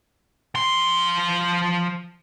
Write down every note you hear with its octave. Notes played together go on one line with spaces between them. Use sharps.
F3 C6